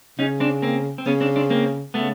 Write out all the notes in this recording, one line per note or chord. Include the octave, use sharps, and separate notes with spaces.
C#3 C#4 D#4
C4 D4
A#3 C4
C4
C#3 B3 C#4
C4 D4
C4 D4
A#3 C4
C#3 A3 B3